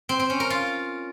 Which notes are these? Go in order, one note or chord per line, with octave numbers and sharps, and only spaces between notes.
C4
C4
C#4
A#4
F4